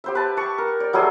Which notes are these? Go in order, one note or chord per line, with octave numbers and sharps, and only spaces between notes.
G4 C5 E5
B4 A5
A5 C#6
A#4
D5
F#3 G3 A3 G#4